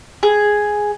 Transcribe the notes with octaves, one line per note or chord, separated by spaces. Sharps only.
G#4